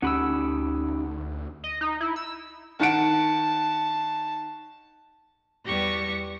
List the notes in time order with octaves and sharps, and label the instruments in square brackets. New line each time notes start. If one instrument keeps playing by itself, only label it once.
[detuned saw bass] D2 [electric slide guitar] C#4 D#4 G4 [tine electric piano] F#5 B5 E6
[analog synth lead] D#5
D#4
E4
E6
[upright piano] D#3 F#5 D7 [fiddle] A5
[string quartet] E2 G3 B3 G4 C#6 A#6